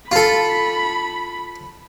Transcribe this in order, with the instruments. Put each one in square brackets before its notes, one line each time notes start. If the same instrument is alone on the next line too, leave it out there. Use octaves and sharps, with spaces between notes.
[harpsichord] F4 A4 [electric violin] B5